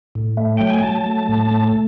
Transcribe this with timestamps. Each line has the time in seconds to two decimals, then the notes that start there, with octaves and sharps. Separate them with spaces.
0.15 A2
0.37 A3
0.57 F#3 G5
0.70 G#5
0.83 F#3 A5
1.06 A3
1.29 A2
1.51 A3